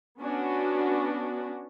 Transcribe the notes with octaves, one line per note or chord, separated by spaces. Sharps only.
B3 C#4 D4 F#4